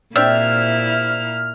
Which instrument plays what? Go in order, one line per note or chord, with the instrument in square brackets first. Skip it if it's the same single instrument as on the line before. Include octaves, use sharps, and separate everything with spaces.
[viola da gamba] A#2 E4 [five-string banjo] C4 D4 G4 [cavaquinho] E5 [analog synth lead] F6